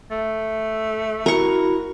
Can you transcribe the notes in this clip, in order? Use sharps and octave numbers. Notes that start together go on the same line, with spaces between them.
A3
E4 F#4 A#4 C#6